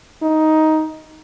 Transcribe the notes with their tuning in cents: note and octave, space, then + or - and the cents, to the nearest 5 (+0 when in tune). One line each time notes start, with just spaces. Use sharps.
D#4 +10